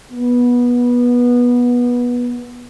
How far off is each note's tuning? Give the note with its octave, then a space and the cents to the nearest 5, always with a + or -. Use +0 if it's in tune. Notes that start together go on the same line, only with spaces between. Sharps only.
B3 -20